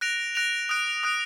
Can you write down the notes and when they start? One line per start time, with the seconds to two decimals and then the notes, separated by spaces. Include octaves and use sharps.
0.01 F#6 A#6 D7 F7
0.35 F#6 A#6 D7 F7
0.69 D#6 F#6 D7
1.03 D#6 F#6 D7